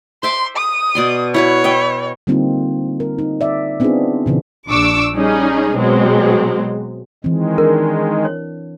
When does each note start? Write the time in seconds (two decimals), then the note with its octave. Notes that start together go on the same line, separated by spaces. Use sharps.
0.23 C5 E5 C6 D6
0.57 D#6
0.95 B2 D5 C6
1.34 E4 F#4 B4 C#5
1.64 D#5 E5 G5
2.27 D3 G3 A#3 C4 D#4 F4
3.00 A#4
3.19 D#4
3.41 D5 E5
3.80 B3 C4 D4 D#4 F4 G#4
4.26 A#2 C#3 E3
4.69 A#1 D4 C#6 D6 E6
5.15 G3 C#4 D#4 G#4
5.76 B2 F#3 G#3 C4
7.24 D#3 E3 G#3 C4
7.58 D4 A#4
8.25 C#5